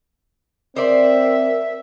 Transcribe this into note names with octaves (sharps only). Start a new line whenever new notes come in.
C4 A#4 C5 D5 E5